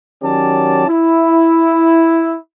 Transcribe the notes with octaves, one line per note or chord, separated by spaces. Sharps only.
D#3 F#3 C#4 G4 D5 A5
E4